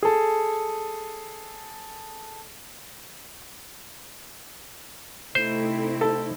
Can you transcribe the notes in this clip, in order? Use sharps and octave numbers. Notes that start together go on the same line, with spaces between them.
G#4 A4
C3 A3 C4 D#4 E4 C5
A4